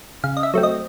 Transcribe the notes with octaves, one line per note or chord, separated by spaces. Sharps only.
C#3 F5
D#5
E5
F#3 A3 C4
D#5